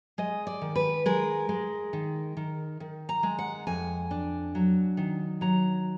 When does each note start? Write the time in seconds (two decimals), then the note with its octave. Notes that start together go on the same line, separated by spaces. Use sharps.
0.18 G#3 D#5
0.47 D5
0.61 D#3
0.76 B4
1.06 G#3 A#4
1.49 G#3
1.93 D#3
2.37 D#3
2.80 D#3
3.09 A#5
3.23 G#3
3.39 F#5
3.67 F2 G#5
4.11 D4
4.55 F#3
4.97 D#3
5.41 F#3 A#5